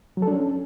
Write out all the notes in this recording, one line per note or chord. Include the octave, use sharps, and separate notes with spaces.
F#3
A4
D4
C#4